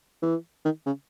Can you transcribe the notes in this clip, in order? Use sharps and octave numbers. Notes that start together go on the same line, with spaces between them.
E3
D#3
C#3